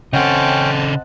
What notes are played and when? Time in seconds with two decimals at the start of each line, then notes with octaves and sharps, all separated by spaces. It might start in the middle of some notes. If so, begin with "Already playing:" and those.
0.13 C#3 C4 C#4 A4 D#5 F#5 G5 A5